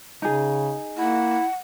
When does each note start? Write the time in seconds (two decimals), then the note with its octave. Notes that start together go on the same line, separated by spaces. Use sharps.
0.22 C#3 D#4 G#4
0.98 A#3 E4 F#5